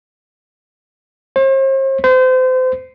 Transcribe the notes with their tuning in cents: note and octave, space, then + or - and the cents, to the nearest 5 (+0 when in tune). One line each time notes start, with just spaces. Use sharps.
C5 +40
C5 -35